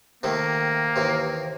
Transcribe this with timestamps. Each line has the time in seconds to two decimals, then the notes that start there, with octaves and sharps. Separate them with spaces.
0.23 C3 D#3 A3 A#3
0.96 D#2 C3 E3